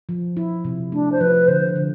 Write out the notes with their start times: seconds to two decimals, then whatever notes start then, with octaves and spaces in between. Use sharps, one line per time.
0.09 F3
0.37 E4
0.65 C3
0.92 A3 D4
1.12 C5
1.21 F3 B4
1.48 D3 C5
1.76 D3